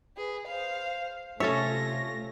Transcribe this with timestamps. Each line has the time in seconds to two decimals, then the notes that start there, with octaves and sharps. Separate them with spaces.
0.17 G#4 B4
0.47 C5 F5
1.40 C3 A3 C#4 F4 A4 C#5 E5 A#6